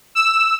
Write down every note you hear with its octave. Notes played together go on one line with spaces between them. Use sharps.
E6